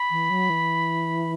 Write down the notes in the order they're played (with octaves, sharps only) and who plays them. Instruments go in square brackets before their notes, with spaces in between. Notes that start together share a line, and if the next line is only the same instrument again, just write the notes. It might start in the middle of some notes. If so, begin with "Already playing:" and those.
Already playing: [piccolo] B5
[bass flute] E3
F#3
E3